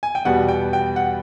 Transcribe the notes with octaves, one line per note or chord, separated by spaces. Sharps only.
G#5
G5
E2 B2 G3 B3 F#5
G5
G5
F#5